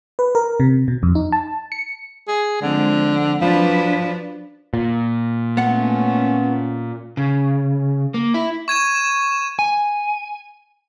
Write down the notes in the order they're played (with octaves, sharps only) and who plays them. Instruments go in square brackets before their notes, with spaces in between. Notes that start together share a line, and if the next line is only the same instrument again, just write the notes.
[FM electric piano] B4
A#4
C3
B2
F2
D#4
A5
C#7
[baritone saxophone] G#4
[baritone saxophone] D3 [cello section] F3 G#3 C4
[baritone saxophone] F3 [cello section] F#3 D4 B4
[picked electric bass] A#2
[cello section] A3 C#4 [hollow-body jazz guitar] B3 F#5
[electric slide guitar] C#3
A#3
E4
[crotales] C#6 G#6 D#7 E7
[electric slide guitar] G#5